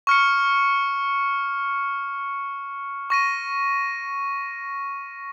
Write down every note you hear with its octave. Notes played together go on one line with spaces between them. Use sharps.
C#6 F6 C#7
C#6 A#6 D#7